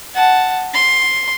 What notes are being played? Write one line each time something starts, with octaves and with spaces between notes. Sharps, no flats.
F#5 A5
C6